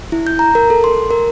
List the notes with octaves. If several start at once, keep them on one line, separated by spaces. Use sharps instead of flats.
E4
G6
A#5
A#4
A4
C6
A#4